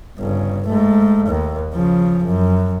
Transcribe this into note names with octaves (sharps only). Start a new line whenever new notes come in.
G1 C#3
G#2 A3
D#2
C#3 F3
F#2